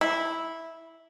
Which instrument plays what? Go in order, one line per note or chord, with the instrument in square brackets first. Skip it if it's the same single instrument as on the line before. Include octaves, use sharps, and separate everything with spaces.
[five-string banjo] E4